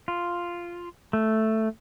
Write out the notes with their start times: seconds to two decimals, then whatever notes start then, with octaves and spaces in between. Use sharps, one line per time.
0.08 F4
1.13 A3